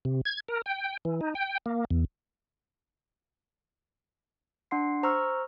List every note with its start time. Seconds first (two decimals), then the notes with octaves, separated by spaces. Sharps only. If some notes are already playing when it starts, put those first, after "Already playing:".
0.05 C3
0.25 G#6
0.48 A#4
0.66 G5
1.05 E3
1.21 D#4
1.35 G5
1.66 A#3
1.90 E2
4.71 D4 F#5 C6 C7
5.03 C5 A#5 C#6 E6 F6